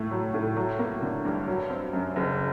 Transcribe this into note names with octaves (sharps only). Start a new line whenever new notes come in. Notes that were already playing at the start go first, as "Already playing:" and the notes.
Already playing: A2 A3
F#3
A2
F#3
A#3
D3
G2
F#3
C4
F#2
F#1